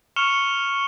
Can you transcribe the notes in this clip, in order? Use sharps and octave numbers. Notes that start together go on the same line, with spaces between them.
C#6 F6 C#7 E7 F7 G7